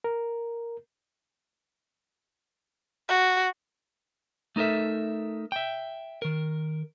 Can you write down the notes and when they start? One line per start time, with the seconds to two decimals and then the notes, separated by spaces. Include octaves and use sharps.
0.04 A#4
3.09 F#4
4.56 A3 D#4 A4 A#4 E5
5.52 E5 G5
6.22 D#3 A#4